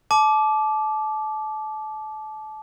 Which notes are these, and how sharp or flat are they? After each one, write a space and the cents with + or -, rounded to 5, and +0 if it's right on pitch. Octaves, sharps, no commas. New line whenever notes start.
A5 -30 D6 +0